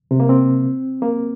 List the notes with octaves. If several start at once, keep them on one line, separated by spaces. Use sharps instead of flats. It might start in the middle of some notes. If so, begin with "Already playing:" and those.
C3
A#3
C4
A#3